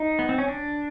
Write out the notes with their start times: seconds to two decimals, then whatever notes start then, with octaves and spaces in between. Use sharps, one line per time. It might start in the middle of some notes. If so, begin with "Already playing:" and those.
Already playing: D#4
0.19 B3
0.29 C4
0.38 C#4
0.48 D4